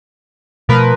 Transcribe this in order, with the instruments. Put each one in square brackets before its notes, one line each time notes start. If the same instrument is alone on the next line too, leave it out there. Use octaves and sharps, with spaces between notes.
[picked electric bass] B2 A3 [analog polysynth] F3 A#4 B4